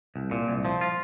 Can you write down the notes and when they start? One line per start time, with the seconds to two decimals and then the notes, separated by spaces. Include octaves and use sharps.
0.16 C2
0.31 A#2
0.48 C2
0.65 F3
0.81 F4